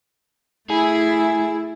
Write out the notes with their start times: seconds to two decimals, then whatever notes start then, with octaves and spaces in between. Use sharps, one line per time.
0.70 A3 E4 G#4